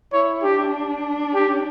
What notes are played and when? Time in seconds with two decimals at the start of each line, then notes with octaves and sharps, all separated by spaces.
0.13 E4 C#5
0.43 D4 G4
1.34 G4